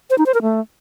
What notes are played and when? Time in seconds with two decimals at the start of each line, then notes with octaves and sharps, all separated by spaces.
0.10 C5
0.18 D#4
0.26 C5
0.34 A#4
0.42 A3